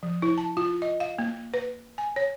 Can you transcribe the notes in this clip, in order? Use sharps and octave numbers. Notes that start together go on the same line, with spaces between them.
F3
E4
A5
F4
D#5
F5
A#3
B4
G#5
C#5